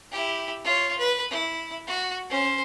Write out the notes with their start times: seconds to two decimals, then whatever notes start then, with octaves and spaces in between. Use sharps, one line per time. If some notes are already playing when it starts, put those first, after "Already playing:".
0.12 E4 G4
0.64 F4 C#5
0.98 B4
1.30 E4
1.87 F#4
2.30 C#4 C5